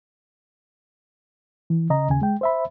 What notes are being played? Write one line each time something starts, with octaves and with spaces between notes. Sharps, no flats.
E3
C#3 D#5 A#5
D#2 C#3 G#5
G#3 G5
C5 E5 B5